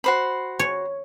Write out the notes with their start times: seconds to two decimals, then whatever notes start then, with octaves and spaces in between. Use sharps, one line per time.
0.04 F#4 C5 B5
0.59 C#5